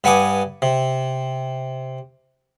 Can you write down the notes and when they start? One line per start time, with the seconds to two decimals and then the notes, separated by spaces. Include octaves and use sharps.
0.04 G2 B4 F#5 G#5 D6 D#6
0.62 C3